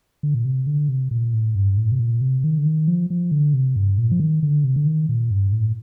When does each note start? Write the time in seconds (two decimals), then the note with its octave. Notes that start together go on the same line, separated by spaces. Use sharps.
0.23 D3
0.34 A#2
0.45 C3
0.67 D3
0.89 C3
1.11 A#2
1.33 A2
1.55 G2
1.77 A2
1.92 C3
1.99 A#2
2.21 C3
2.44 D#3
2.58 D3
2.66 D#3
2.88 F3
3.10 F3
3.31 D3
3.54 C3
3.76 G2
3.98 A#2
4.12 F3
4.20 D#3
4.43 D3
4.64 C3
4.76 D3
4.86 D#3
5.09 A#2
5.31 G2
5.52 A2